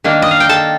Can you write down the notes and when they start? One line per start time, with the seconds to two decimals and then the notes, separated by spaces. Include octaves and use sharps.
0.04 D#3 A#3 D4
0.22 D#5
0.31 F5
0.40 G5
0.49 A4 A5